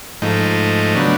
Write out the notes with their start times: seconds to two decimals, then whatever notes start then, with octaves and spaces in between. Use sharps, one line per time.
0.22 G#2 F3 A3 D#4
0.95 C#3 F#3 B3 D4